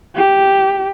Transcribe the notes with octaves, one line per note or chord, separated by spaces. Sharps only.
G4